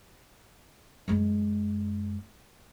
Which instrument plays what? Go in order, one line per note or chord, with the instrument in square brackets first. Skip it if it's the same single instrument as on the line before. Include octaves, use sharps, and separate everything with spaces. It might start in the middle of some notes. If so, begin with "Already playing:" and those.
[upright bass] F#2 G#3